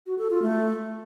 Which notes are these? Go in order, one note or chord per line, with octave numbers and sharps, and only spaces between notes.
F#4
A4
F4
A3